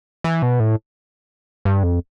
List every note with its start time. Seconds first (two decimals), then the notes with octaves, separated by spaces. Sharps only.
0.24 E3
0.42 B2
0.60 A2
1.65 G2
1.83 F2